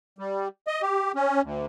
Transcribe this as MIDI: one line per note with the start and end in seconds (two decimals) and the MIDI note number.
0.19 0.48 55
0.67 0.82 75
0.82 1.12 67
1.15 1.42 61
1.44 1.66 38